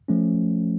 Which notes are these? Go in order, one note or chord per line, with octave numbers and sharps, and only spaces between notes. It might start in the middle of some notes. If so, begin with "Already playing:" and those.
F3 A3 C#4